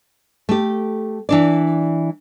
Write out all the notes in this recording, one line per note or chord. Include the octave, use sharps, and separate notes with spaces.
A3 G4
E3 D4 D5